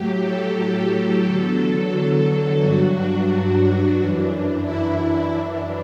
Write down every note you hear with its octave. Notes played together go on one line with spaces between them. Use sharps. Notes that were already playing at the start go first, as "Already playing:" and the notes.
Already playing: A2 F#3 G4
A4
E2 D3 F#3 A4
G2 F#3 F#4
D4
F#2 E3
E4
D4
F#2 E3